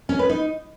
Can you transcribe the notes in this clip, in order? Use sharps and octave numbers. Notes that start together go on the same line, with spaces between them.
C#4
B4
D#4